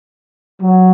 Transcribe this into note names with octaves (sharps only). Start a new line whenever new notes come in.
F#3